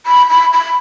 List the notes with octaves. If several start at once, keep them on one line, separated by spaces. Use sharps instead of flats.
B5
B5
B5